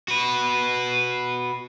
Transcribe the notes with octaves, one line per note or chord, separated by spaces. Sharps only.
F#4 B4